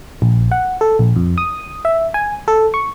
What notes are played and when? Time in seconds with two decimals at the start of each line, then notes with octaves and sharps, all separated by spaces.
0.22 A#1
0.52 F#5
0.81 A4
0.99 A#1
1.16 F2
1.38 D#6
1.85 E5
2.14 G#5
2.48 A4
2.74 C#6